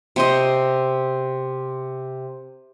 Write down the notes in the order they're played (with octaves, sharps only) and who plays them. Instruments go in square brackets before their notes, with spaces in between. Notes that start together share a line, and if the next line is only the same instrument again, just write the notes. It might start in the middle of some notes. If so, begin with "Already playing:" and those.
[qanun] C3 C5 D#5